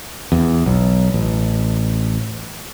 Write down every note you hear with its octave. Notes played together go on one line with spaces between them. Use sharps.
E2
B1
A1